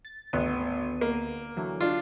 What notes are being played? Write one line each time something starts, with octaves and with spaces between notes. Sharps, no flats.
A6
G#1 D2 B3 D#7
A#3
D3 E3 F#3
D4 F4